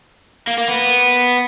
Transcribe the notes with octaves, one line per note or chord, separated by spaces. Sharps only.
A#3
A#3
B3